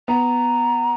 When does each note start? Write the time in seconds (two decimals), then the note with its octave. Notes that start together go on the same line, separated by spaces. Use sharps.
0.08 B3 A#5